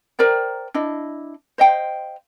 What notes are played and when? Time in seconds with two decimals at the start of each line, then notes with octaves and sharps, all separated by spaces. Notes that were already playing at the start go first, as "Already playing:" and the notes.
0.19 A#4 C5 D5 G5
0.74 D4 E4 D#5
1.58 C5 D#5 F5 G5